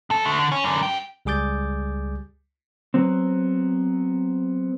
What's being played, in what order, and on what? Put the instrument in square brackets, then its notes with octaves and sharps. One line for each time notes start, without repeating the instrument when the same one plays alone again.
[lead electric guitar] F2 A4
D3 A3
D3
C#4
F#2 D3
G2 G5
[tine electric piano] C#2 G3 G#4 D6 G6 A6
[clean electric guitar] F#3 B3 C4